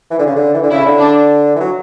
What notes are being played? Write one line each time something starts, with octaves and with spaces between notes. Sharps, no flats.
E3
D3
C#3
D3
E3
D3
C#3 E4
D3
D4
E3
F#3